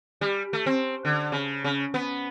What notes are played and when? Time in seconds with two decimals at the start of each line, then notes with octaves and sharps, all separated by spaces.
0.21 G3
0.53 A3
0.66 C4
1.05 D3
1.32 C#3
1.64 C#3
1.94 B3